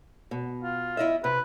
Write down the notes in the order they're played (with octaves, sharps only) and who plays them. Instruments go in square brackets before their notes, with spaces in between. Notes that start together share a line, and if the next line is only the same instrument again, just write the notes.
[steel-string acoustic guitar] B2
[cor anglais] F4
[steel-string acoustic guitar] E4 D#5 E5
[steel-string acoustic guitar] C3 [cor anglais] B4